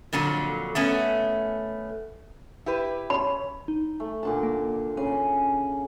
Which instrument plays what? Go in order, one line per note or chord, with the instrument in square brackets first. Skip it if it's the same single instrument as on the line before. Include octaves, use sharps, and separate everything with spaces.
[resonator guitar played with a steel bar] F2 A#2 D3 F#3
A3 B3 C#4
E4 G4 B4
[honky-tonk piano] C#4 [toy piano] B5
[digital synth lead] D#4
[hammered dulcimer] A3
A#2 D3 A5
[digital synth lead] A#3
[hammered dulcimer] C#3 [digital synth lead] G#5